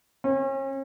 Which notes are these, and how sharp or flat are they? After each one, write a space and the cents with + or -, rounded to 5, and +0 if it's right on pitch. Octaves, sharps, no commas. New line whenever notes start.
C#4 -40